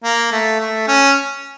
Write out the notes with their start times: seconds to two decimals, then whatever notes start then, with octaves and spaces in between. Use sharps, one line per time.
0.04 A#3
0.32 A3
0.60 A3
0.88 C#4